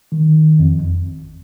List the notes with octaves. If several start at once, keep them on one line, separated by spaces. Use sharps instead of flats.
D#3
F2
G#1